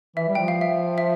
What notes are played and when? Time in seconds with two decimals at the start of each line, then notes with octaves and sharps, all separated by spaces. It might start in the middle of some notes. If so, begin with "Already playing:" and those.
0.16 E3 E5
0.28 G3
0.35 F3 G5
0.48 F5
0.61 E5
0.98 E5